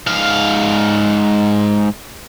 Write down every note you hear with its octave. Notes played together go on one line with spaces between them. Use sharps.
G#2 F5